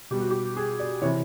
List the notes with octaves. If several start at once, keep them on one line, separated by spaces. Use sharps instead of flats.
B2 G3 G4
F#4
G4
G#4
D5
C3 E3 C#5